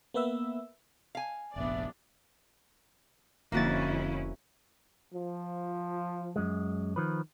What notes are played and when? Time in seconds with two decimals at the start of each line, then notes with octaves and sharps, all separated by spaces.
0.14 A#3 B3 B4 E5 E6
1.15 F5 G#5
1.56 F1 A#1 B3 D4 D5 E5
3.52 E1 F2 D3 A#3 C#4 E4 F#4 A6
5.13 F3
6.36 F#2 G#3
6.96 D#3 F3 B4